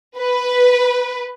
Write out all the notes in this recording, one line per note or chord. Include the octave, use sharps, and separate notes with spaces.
B4